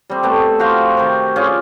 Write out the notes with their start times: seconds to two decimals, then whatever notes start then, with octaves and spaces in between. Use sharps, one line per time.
0.10 G3 C4
0.23 A3 B3 C4
0.59 F#4 G4 C5 F5
0.97 C3 D#3
1.36 C#4 F4 G#4 D5